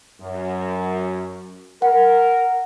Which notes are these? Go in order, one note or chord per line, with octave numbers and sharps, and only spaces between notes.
F#2
A#4 F#5